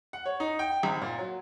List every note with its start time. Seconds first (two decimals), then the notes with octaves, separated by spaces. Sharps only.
0.13 F#5
0.26 C#5
0.40 D#4
0.59 G5
0.83 G#1
1.02 A#2
1.18 F#3